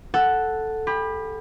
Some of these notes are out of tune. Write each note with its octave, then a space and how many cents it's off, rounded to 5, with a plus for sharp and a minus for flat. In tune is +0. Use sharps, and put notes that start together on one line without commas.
A4 +0 F#5 +0
G4 +35 B5 -5